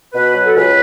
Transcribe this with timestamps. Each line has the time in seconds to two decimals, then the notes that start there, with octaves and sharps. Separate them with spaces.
0.13 B2 B4
0.34 F#3
0.45 A4
0.55 C#2 B4